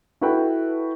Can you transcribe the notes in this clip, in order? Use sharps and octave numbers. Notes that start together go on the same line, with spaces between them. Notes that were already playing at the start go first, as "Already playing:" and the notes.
E4 F#4 A4 B4 G5 B5